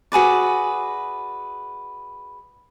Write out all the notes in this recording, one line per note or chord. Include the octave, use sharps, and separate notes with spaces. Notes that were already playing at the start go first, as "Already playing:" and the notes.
F#4 G#4 B4 D5